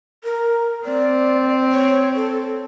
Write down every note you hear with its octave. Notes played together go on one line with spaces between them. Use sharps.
A#4
C4 D5
C#5
A4